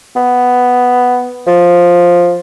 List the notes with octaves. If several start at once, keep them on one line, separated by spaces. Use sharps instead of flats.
B3
F3